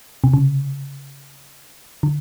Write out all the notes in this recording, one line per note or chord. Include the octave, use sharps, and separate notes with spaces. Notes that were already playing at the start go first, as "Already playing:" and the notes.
C3
C#3
D3